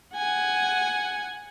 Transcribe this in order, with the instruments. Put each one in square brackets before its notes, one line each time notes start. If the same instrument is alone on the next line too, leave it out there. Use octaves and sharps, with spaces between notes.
[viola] F#5 G#5